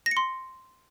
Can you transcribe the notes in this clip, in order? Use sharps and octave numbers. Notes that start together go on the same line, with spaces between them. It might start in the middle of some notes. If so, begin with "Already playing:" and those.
A#6
C#7
C6